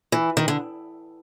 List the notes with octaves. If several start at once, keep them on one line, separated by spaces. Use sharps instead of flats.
E3
D#3
D3